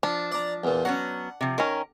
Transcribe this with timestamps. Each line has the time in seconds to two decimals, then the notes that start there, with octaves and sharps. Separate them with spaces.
0.03 F3 D4
0.32 D5 A#5
0.64 E2 A#2
0.85 F#3 B3 C#4 F#5
1.41 C3 F3
1.58 D#3 C#4 A#4